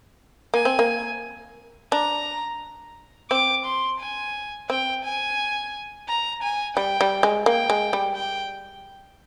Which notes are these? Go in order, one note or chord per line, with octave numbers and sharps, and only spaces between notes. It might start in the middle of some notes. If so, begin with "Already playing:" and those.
A#3 G#5
C4
A#3
D4 A#5
C4 D6
C6
G#5
C4 G5
G#5
A#5
G#5
G3 G5
G3
G#3
A#3 G5
G#3
G3
G5